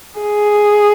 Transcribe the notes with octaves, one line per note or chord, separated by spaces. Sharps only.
G#4